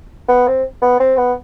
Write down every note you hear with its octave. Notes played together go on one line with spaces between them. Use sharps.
B3
C4
B3
C4
B3